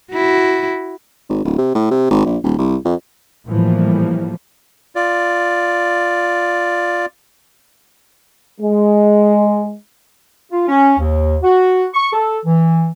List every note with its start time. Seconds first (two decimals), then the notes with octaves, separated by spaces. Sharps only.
0.13 E4 F#4
1.29 G#1
1.45 D1
1.58 C3
1.75 A2
1.91 C3
2.10 G#1
2.25 A#1
2.43 D#1
2.58 C2
2.85 F2
3.48 A2 E3 F3 G3 A#3
4.96 F4 D5
8.61 G#3
10.52 F4
10.68 C#4
10.99 D#2
11.43 F#4
11.94 C#6
12.13 A4
12.45 E3